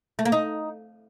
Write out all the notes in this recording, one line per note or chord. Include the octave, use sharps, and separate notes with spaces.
A3
A#3
D#4